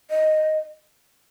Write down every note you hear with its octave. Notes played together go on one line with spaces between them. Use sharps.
D#5